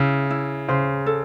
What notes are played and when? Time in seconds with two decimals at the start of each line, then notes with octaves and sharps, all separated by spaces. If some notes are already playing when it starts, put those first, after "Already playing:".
Already playing: C#3 E4
0.30 E4
0.68 C#3 C5
1.06 A4